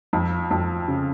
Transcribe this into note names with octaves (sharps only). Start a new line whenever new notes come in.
F2
F2
C#3